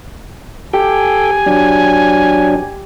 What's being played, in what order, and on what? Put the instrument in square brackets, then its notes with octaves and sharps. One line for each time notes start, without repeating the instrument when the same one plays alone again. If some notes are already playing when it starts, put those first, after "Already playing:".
[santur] G4 [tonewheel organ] A4 G5 [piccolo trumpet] G#5
[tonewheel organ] F#3 D4